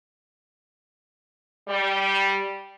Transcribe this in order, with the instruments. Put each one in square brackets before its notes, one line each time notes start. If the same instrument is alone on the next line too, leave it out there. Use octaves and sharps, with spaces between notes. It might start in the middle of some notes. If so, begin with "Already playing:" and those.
[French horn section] G3